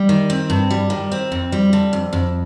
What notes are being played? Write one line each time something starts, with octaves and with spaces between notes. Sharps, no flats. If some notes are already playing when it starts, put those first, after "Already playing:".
Already playing: G3
D#3
C4
G2
G3
D#3
C4
F2
G3
D3
F2
F2